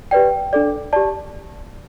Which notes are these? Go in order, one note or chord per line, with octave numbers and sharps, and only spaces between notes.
G4 B4 D5 G5
D4 A4 D5
G4 D5 A5